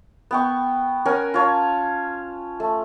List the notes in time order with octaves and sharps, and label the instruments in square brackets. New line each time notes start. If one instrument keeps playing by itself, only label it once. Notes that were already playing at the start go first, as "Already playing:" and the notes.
[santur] B3 G5 C#6
C#4 A#4 F#5 G#5
F4 C#5 A5
A3